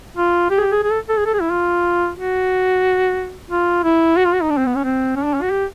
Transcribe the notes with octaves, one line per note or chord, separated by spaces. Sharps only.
F4
G4
G#4
G4
G#4
G#4
A4
A4
G#4
A4
G#4
E4
F4
F#4
F4
E4
F#4
F4
F#4
D#4
D4
C4
B3
C#4
C4
C#4
D4
C#4
F#4
G4